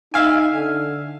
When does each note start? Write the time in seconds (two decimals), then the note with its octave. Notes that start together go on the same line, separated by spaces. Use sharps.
0.14 D#4 E5 F5 G#5
0.53 D3